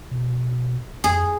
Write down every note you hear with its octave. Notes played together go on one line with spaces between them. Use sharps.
B2
F2 G#4